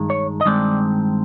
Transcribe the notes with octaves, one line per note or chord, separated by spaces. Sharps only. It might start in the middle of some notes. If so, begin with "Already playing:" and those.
Already playing: G2 D#3 G#3
C#5
D#5
G2 D#3 G#3 C4 D5